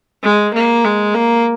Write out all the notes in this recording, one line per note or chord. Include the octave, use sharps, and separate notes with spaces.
G#3
A#3
G#3
A#3